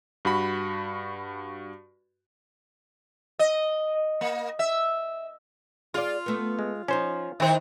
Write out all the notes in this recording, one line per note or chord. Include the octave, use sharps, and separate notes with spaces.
G2 F#4 B5
D#5
A#3
E5
F4 G#4 D5
A3 B3
G#3
F3 C#4 D#4 C5
D#3 E4 C5